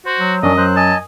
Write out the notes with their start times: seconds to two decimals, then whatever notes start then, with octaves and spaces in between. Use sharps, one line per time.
0.06 F#4 C5
0.19 F#3
0.43 F#2 C#4 D4 D#5
0.58 F#3 C5 F#6
0.76 D#5 G#5 A5